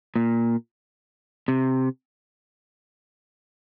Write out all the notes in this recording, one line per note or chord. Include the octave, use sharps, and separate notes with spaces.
A#2
C3